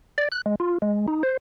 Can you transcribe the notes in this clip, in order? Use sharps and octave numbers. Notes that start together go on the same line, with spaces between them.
D5
F#6
G#3
F4
G#3
D#4
C5